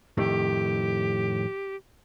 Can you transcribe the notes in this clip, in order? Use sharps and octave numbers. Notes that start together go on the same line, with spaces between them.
F2 A2 D#3 G4